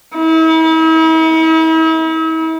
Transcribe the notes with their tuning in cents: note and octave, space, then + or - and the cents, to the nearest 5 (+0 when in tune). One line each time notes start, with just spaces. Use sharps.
E4 -45